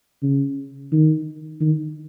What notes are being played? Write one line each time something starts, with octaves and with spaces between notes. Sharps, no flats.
C#3
D#3
D#3